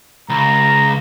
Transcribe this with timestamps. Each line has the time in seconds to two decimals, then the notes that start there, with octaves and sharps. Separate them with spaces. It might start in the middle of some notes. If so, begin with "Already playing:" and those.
0.29 C#2 A#5